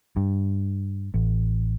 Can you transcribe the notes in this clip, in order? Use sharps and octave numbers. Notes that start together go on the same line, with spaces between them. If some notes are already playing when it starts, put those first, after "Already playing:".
G2
A1